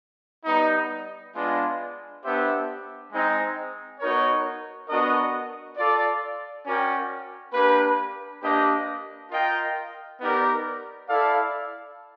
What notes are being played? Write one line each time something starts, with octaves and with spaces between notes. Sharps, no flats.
G3 B3 D#4
G#3 B3 D4 F4
B3 D4 G4 C5 E5
G#3 C4 D#4
B3 D#4 F#4 A#4 C#5
B3 D4 F#4 A#4 D#5
F4 A4 D5
C#4 F#4 A#4 D5 G5
A#3 D4 G4 B4
A#3 D4 G4 B4 D#5
F4 A#4 D#5 G5
B3 D#4 G4 A#4 D5
E4 A4 D5 F5